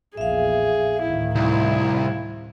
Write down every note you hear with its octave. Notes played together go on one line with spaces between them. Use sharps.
A#1 E2 G#4 E5 F5
D2 A2 D#3 E4
C2 E4